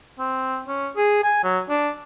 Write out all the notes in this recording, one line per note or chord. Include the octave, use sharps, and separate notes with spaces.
C4
C#4
G#4
G#5
F#3
D4